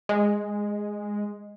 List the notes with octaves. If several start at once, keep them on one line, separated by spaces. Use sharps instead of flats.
G#3